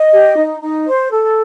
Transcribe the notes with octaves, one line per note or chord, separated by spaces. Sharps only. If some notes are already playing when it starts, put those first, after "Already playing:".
Already playing: D#5
G4
D#4
D#4
C5
A4